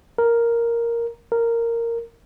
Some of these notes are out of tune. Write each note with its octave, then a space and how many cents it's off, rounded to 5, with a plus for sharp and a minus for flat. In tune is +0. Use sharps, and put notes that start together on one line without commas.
A#4 +0
A#4 -10